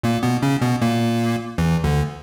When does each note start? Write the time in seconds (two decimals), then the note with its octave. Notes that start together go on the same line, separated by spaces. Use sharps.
0.03 A#2 A#3
0.23 B2 B3
0.42 C#3 C#4
0.61 B2 B3
0.81 A#2 A#3
1.58 E2 E3
1.84 D2 D3